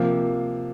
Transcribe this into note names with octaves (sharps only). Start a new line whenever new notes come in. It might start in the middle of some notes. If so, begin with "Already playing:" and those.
Already playing: C3 F3 A#3